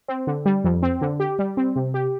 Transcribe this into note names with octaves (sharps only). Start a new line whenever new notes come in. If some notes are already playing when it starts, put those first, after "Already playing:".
C4
D3
G3
F2
C4
D3
G4
G3
C4
C3
G4